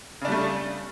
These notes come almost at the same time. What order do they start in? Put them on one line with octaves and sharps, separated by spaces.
C#3 D4 G3 A3